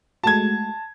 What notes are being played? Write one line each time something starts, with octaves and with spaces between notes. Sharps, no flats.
G#3 A3 F#4 A5 G#6